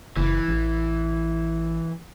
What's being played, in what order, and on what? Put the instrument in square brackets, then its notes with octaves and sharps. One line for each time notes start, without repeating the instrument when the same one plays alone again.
[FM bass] F#1 [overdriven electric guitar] E3
[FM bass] A1